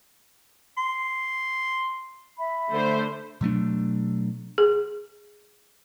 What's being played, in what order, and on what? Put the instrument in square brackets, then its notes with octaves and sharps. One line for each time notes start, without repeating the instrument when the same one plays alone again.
[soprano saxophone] C6
[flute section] E5 B5
[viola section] D3 A3 C5
[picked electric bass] B2 F#3 A3 D4
[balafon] G#4